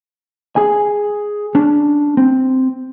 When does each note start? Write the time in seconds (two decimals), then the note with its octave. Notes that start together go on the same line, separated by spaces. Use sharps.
0.56 G#4 G#5
1.55 C#4 D4
2.17 C4